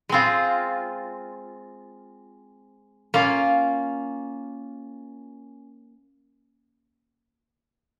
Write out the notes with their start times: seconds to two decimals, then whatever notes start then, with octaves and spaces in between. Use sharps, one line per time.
0.09 G#3 C4 F4
3.14 A#3 C#4 F4